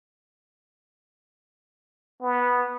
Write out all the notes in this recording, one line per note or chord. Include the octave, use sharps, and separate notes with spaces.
B3